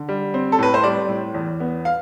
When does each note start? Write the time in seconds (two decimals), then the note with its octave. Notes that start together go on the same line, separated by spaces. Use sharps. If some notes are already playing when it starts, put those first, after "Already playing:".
Already playing: D3
0.09 G3
0.34 C4
0.52 A4
0.59 A2 B4
0.74 C5
0.84 G3 D5
1.09 A2
1.34 E2
1.60 B3
1.85 F5